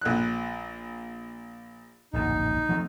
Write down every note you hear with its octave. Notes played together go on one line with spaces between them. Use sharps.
A#1 F#6
D1 A#1 F#2 D#4
F3 A3 C4